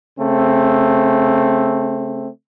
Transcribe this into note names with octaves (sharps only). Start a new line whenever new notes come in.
C#3 A3 C4